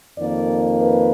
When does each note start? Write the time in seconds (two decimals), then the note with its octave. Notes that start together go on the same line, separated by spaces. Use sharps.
0.18 F2 D#3 A#3 D5
0.79 B4